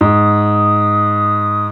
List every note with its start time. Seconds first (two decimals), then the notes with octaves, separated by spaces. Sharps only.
0.01 G#2 D#6